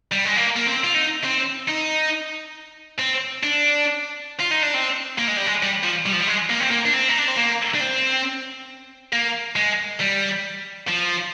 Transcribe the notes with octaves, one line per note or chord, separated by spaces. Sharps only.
G3
G#3
A#3
A#3
C4
F4
D#4
C4
D#4
C4
D4
F4
D#4
D4
C4
A#3
G#3
G3
G#3
G3
F3
G3
F3
G3
G#3
A#3
C4
A#3
D4
C4
D#4
D4
C4
A#3
D4
C4
A#3
G#3
G3
F3